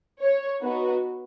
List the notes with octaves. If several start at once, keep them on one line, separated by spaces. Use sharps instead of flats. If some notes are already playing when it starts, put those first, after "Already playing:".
C#5
B3 D#4 F#4 B4